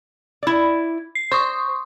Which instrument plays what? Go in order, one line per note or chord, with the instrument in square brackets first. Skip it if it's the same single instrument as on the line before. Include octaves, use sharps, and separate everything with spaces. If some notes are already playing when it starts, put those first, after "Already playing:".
[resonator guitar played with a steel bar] E4 D5
[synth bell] C7
[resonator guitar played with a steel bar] C5 [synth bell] C6 C#6 D#6